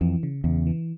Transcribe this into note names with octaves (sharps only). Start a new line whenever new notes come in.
F2 E3
C#3
E2 C#3
E3